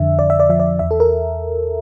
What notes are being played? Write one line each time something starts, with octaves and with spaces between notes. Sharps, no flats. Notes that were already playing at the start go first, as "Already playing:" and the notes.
Already playing: F2 D3 E5
F2 D5
E5
D5
F3 E5
D5
E2 E5
A4
A#4